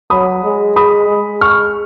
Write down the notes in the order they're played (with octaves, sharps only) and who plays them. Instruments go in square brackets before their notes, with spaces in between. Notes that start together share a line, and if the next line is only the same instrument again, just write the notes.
[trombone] F#3 [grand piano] B5 D#6
[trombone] G#3
[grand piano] B5 D#6
[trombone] G#3
[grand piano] C#6 F6